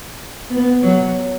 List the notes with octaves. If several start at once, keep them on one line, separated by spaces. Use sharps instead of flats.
B3
F#3